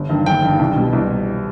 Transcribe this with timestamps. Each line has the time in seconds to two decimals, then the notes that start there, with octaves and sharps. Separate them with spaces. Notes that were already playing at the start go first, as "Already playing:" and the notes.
Already playing: G1
0.09 G2 D#3
0.26 G1 G5
0.43 G2 D#3
0.59 C2
0.76 B2 G3
0.93 C2